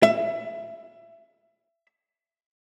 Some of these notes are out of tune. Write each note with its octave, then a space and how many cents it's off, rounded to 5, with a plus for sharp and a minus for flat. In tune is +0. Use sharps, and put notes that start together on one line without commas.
E5 +25